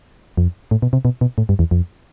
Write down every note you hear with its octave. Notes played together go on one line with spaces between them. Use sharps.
F2
A2
B2
C3
B2
B2
A2
G2
E2
F2